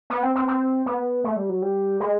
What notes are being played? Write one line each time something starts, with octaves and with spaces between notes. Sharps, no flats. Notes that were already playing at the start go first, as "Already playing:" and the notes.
B3
C4
C4
C4
B3
A3
G3
F#3
G3
G#3